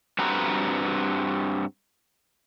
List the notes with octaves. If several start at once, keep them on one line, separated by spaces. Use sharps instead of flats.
G2 C4 F#4 B4 A#5